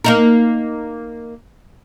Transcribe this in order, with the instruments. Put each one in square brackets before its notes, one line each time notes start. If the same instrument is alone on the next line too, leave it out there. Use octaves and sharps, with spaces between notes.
[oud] A#3 D#4 A#4